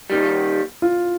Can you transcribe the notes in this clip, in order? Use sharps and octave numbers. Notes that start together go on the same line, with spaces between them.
D#2 D#3 G3
F4